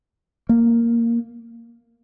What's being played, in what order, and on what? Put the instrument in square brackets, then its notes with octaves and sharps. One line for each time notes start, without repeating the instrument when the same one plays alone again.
[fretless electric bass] A#3